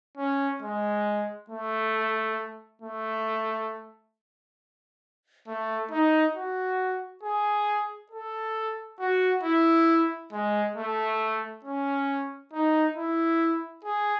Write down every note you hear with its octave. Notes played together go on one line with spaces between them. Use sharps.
C#4
G#3
A3
A3
A3
D#4
F#4
G#4
A4
F#4
E4
G#3
A3
C#4
D#4
E4
G#4